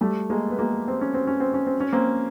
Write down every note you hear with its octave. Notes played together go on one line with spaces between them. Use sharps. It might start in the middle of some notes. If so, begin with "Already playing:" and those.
G3 A3
G#3 A#3
B3
G#3 A#3
C4
C#4
C4
C#4
C4
C#4
C4
C#4
A#3 C4